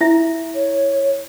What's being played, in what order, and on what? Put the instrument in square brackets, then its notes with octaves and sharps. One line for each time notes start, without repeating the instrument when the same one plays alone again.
[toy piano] E4 E5
[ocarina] C#5